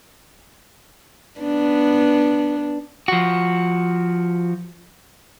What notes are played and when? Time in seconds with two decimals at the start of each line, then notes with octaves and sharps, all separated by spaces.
1.40 B3 D4
3.08 F3 F#4